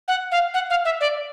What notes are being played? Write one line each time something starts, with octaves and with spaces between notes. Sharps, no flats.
F#5
F5
F#5
F5
E5
D5